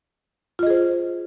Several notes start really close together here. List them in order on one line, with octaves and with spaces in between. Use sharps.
F4 D#5 G#4 C5